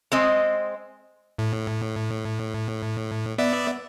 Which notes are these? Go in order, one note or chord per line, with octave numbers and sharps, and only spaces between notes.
G#3 C4 D#5
A2
B3 D5 E5